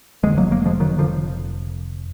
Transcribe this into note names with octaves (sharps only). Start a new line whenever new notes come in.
F1 D#2 D3 F3 G#3
F#3 A#3
F#3 A#3
F3 G#3
D#3 F#3
D3 F3